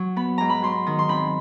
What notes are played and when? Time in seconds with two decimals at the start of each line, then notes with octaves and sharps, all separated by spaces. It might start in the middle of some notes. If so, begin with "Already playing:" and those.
Already playing: F#3
0.16 B3 B5
0.38 G#2 A#5
0.49 B5
0.62 F#3 C6
0.87 D#3
0.99 C6
1.09 C4 B5